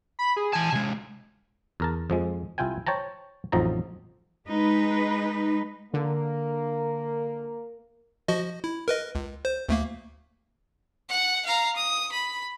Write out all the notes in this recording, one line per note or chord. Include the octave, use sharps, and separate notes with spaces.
B5
G#4
E3 G#5 A5
C3 G#3
E2 A#4 A5
F2 F3 G#3
C2 E4 F4 G5 G#5
C5 C#5 G5 A5 A#5
A1 F2 F3 F#3 D#4 A#5
G#3 D#4 B4
D3 A#3 A#4
F3 F#4 D#5
E4
A#4 B4 D#5
C#2
C5
D2 A3 A#3
F#5
F5 A#5
D#6
B5